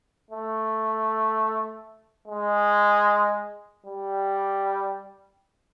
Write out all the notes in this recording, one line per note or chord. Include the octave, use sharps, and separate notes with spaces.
A3
G#3
G3